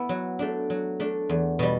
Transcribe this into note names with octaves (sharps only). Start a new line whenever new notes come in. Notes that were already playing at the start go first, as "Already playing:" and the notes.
Already playing: B3 E4
F#3
A3 D4
F#3
A3 D4
E2
B2 G3